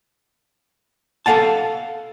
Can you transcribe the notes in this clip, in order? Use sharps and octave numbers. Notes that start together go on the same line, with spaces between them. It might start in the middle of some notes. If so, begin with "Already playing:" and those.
A4 A#4 F5 F#5 A5